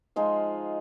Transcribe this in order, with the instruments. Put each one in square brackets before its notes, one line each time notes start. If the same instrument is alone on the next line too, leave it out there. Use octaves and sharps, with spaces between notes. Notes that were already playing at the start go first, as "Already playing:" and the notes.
[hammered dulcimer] F3 G#3 D#4 F4